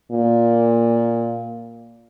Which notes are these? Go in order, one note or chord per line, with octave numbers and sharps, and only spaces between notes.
A#2